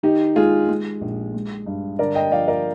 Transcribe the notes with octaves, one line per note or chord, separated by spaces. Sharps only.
D#3 D#4 G4
G#3 F4 G#4
G#3
A#1
G#3
G2
D3 A#4 D5
D#5 G5
F3 D5 F5
A#4 D5